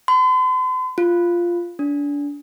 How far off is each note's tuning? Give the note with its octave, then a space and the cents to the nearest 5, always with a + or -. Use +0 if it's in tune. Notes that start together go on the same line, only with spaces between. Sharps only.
C6 -45
F4 -5
D4 -30